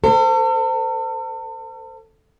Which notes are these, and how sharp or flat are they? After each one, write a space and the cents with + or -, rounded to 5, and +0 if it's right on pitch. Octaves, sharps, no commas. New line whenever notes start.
A4 +40 C5 -20